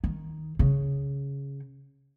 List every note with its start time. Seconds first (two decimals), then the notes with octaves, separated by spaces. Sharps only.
0.04 D#3
0.59 C#3